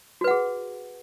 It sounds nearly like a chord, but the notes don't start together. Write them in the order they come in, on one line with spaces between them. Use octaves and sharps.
F#4 B4 F#5 G#4